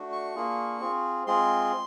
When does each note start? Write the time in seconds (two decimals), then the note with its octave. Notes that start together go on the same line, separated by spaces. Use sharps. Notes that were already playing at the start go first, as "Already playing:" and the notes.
Already playing: A3 D4 F#4
0.12 C#6
0.36 A#3 D4 F4 G#4
0.81 C4 F4 G#4
1.27 G#3 C4 F4 G#4 C6